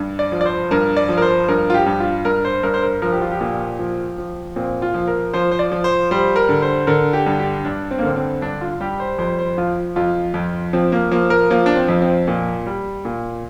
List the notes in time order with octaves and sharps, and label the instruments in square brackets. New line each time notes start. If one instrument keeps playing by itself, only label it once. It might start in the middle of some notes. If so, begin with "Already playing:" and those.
Already playing: [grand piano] G2
D5
F3
D5
C5
G2 A#4
D5
F3
A#4
C5
G2 A#4
F4
G4
G2
F4
G2 A#4
C5
G2 A#4
C5
A#4
F3 A#4
G4
F4
G4
A#2
F3
F3
A#2 C4
F4
F3
A#4
F3 C5
C5
D5
F3
C5
G3 C5
A#4
D3
C5
D3 A#4
G4
G2
G4
G2 D4
C4
A#3
D3 C4
C4
G2 D4
F4
G3 G4
C5
F2 C5
C5
F3 F4
F2 F4
F2
F3 C4
A#3
F3 A#3
A#4
F3 A#3
D4
C4
F2
C4
A#2
G3
A#2